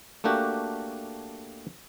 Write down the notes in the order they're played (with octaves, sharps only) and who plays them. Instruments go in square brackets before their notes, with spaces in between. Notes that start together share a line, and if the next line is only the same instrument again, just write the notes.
[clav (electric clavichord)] A3 A#3 D4 F#4 G4